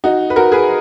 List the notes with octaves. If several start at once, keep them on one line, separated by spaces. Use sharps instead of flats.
D#4 F#4
B4
F#4 A#4
G#4 B4